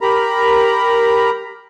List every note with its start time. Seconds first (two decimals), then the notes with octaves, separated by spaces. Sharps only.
0.01 G4 A#4 A#5 B5